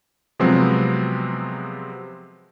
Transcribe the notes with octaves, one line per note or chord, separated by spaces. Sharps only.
C3 F3 F#3 G#3 B3 C4